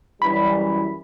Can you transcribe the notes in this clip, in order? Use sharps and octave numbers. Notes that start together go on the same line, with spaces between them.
F#2 E3 G3 B5